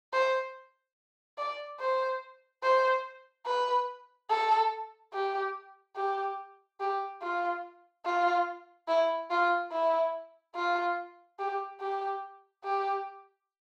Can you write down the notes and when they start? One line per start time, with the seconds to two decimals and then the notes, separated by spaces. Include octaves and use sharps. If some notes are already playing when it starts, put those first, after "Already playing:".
0.13 C5
1.38 D5
1.80 C5
2.63 C5
3.46 B4
4.30 A4
5.13 G4
5.96 G4
6.80 G4
7.22 F4
8.05 F4
8.88 E4
9.31 F4
9.71 E4
10.55 F4
11.39 G4
11.80 G4
12.64 G4